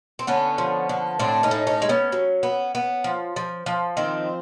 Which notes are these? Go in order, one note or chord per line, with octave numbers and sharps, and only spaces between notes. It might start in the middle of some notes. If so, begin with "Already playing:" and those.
C4
D3 B3 C#4
F3
D3
A2 C4 D4
C#4 D#4
A2
C#4 D#4
G#3
B3 C#4
F#3
B3
B3
F3
F3
F3
D#3 C4